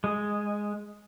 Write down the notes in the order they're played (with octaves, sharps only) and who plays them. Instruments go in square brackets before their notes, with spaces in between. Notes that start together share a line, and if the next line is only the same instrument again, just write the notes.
[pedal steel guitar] G#3